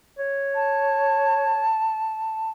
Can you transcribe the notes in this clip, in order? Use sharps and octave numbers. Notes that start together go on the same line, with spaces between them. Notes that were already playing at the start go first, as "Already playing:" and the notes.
C#5
A5